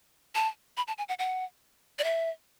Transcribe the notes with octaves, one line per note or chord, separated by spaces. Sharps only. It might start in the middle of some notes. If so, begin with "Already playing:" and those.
A5
B5
A5
G#5
F#5
F#5
D5
E5